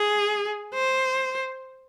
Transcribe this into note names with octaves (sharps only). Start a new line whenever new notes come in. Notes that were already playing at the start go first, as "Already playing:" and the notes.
Already playing: G#4
C5